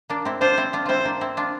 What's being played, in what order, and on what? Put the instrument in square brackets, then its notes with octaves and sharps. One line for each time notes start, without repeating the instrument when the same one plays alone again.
[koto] A#3 D4
C4 E4
[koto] D4 F4 [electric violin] C5
[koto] C4 E4
D4 F4
[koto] C4 E4 F4 [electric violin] C5
[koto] A#3 D4
C4 E4
D4 F4